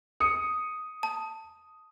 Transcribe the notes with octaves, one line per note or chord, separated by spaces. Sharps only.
D#6 C#7
A5